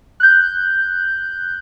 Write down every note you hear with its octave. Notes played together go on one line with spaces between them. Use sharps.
F#6 G6